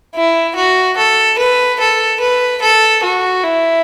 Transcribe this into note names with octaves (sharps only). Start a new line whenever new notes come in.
E4
F#4
A4
B4
A4
B4
A4
F#4
E4